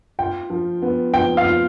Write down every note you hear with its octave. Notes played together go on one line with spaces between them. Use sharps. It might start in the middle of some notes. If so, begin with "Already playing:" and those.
F4 G5
F3
B3
F3 G5
F5
F4